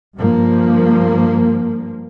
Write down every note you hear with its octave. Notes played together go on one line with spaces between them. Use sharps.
G2 F3 A#3